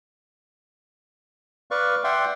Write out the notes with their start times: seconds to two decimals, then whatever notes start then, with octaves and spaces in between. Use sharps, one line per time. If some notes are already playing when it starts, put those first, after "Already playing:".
1.71 B4 D5 F5 C#6
2.04 D5 E5 F#5 G5 C6